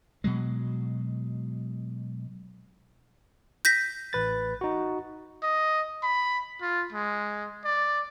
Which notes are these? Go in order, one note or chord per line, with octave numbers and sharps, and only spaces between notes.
B2 F#3 G#3
G6 A#6 B6
A1 B4 A6
D#4 F#4
D#5
B5
F4
G#3
D5